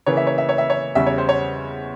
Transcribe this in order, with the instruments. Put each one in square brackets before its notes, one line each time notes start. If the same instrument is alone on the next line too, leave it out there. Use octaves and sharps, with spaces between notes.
[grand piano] C#3 E3 A#3 C#5
E5
C#5
E5
C#5
E5
C#5
E2 C#3 G3 C#4 E5
C#5
C5
C#5